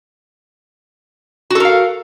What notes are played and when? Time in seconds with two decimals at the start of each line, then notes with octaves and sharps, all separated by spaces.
1.50 F#4
1.55 A4
1.60 A#4
1.65 F5